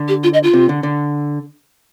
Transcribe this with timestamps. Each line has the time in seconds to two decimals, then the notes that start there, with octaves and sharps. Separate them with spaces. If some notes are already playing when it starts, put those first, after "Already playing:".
Already playing: D3
0.08 G4
0.23 F4
0.34 D#5
0.43 F4
0.53 C3
0.69 D3
0.83 D3